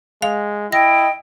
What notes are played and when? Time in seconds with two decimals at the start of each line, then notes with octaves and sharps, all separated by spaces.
0.22 G#3 F5
0.72 E4 D#5 G5 A#6